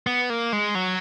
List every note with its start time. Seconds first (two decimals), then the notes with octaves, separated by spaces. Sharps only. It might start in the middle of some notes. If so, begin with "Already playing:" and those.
0.07 B3
0.30 A#3
0.53 G#3
0.75 F#3